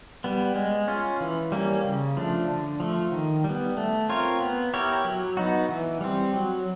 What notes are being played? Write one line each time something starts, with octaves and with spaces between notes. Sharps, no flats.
G3 B3
G#3
C#4 F4
E3
G3 A#3 C#4
C#3
F3 A3 D4
D3
F3 A3
D#3
G3 B3
A3
C4 F4 A#4 C#5
B3
E4 G4 A#4 C#5
F#3
B3 D#4 F#4
E3
G3 C4
F#3